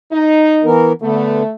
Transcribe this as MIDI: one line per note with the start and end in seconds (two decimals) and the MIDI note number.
0.12 0.68 63
0.64 0.93 52
0.64 0.93 59
0.64 0.93 70
1.02 1.43 50
1.02 1.52 57
1.02 1.43 59